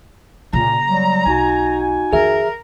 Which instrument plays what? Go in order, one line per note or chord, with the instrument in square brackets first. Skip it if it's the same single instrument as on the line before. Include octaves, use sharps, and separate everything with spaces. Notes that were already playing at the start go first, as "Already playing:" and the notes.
[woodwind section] A#2 [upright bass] C#3 A#3 [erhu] A#5
[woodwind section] F#3 G3
[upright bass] B1 [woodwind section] D#4 F#4 G#5
[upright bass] F2 D#3 [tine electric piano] G#4 E5 [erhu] A#4